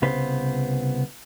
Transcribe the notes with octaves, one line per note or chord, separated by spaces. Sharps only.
C2 C#3 B3 B4 C5